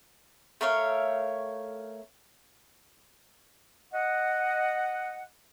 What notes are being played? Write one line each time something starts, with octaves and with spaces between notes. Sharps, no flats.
A3 A#4 C#5 F5
D#5 F#5